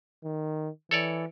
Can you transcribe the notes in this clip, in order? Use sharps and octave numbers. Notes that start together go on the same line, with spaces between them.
D#3
E3 A4 C#5 D5